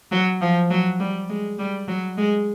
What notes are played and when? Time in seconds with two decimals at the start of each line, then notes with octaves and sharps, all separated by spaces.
0.11 F#3
0.41 F3
0.70 F#3
1.00 G3
1.29 G#3
1.59 G3
1.88 F#3
2.17 G#3